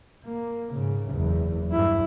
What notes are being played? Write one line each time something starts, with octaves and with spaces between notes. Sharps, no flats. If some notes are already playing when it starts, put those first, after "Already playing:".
A#3
G#2 C#3
F#1 E2
G2 E4